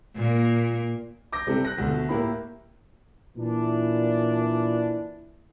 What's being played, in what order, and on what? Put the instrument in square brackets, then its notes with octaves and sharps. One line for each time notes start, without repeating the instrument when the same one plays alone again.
[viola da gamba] A#2 A#3
[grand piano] D6 G6 A#6
C3 G3 C4 E4 A4
F#6 A#6
D2 B2 A3
A2 A#3 E4 G4 B5
[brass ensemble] A#2 E3 D4 [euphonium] E4